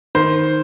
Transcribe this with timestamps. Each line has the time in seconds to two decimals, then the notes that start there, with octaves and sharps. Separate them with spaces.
0.15 D#3 C5